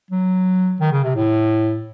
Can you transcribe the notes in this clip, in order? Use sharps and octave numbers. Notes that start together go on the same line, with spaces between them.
F#3
D#3
C#3
C3
A2